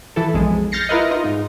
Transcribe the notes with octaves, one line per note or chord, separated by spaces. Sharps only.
E3 E4 A4
B1 F2 G#3
F6 G6 A6 A#6 C7 C#7
E4 F4 A#4 B4 D#5
D#4 F4 D#5
G#2 D#4